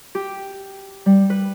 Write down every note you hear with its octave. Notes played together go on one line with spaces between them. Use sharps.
G4
G3
B4